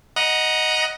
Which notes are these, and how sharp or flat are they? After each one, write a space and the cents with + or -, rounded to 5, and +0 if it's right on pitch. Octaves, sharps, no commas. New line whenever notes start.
D#5 +0 F#5 +0 A#5 +35